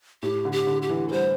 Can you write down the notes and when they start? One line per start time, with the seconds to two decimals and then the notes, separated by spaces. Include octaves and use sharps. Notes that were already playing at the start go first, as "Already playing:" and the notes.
0.23 A2 G4
0.45 D3
0.52 G4
0.67 D3
0.82 G4
0.90 E3
1.08 A4
1.12 G3 C5